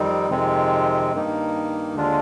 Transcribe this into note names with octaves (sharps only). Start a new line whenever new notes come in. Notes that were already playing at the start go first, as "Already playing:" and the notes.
Already playing: F2 D#3 G3 C4 D#4
F2 C3 D#3 G#3 C4
G2 D#3 A#3 D#4
D#2 D3 G#3 D4 F4